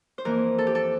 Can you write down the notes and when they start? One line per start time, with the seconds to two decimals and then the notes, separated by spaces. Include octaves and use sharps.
0.18 C5
0.25 F2 E3 A#3 A#4
0.58 A4
0.67 G4
0.75 A4